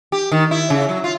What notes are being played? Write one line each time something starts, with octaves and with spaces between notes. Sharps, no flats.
G4
D#3
E4
C#3
F#3
F4